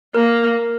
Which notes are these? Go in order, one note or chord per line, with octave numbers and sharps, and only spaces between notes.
A#3 A#4